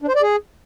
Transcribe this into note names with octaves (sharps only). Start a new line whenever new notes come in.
D4
C5
D5
G#4